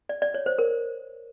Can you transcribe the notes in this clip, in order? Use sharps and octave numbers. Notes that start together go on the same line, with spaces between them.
D5
D5
C#5
C5
A#4